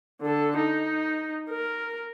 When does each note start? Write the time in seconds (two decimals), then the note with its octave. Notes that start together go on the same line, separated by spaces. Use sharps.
0.21 D3 A4
0.57 D#4
1.50 A#4